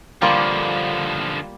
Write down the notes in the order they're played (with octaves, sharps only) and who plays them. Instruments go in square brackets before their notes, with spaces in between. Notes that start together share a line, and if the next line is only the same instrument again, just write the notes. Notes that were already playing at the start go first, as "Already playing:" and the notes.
[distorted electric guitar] D3 F3 [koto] G3 A#3 F4